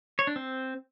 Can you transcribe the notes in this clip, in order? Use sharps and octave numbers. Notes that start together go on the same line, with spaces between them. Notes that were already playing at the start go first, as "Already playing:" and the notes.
C#5
D4
C4